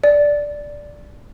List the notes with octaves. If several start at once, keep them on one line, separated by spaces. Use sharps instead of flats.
D5